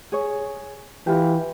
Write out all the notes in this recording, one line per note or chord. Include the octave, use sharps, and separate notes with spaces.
G#4 C#5
E3 F4 G4